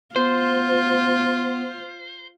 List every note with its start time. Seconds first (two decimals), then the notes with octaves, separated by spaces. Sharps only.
0.16 B3 F4 C5